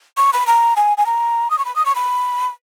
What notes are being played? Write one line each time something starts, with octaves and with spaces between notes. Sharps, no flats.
C#6
B5
A#5
G#5
G#5
A#5
D#6
C#6
B5
D#6
C#6
B5